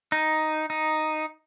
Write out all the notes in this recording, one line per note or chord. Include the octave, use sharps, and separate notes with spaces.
D#4
D#4